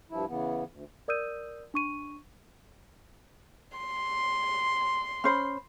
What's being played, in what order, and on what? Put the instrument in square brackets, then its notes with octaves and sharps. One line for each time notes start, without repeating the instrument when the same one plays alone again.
[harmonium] G2 F3 E4
C#3 E3 B3
D2
[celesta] A#4 D5 D#6 E6 G6 D#7
D4 C#6 D#7
[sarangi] C6
[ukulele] C#4 C5 B5